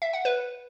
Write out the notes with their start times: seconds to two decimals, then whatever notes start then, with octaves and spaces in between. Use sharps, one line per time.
0.02 E5
0.13 F#5
0.25 B4